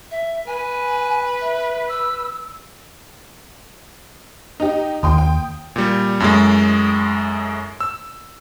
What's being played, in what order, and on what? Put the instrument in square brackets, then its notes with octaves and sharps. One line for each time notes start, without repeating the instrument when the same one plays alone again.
[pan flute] E5
[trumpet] B4 [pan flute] G#5
[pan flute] E5
E6
[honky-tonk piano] D#4 G4
[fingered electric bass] D#2 [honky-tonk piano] G5 C6 D#6
[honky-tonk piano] G5
[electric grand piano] A#2 G3
F#2 A2 G#3
E6